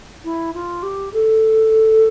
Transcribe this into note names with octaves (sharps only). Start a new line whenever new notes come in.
E4
F4
G4
A4